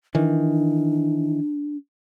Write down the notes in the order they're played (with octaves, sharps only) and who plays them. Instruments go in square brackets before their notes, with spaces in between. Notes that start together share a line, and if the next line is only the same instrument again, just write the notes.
[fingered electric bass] D#3 E3 [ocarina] D4